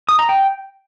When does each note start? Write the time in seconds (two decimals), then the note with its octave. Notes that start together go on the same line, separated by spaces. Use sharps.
0.09 D#6
0.19 A#5
0.29 G5